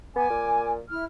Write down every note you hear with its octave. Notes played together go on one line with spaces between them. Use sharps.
B3 G#5 D6
A#2
E4 F6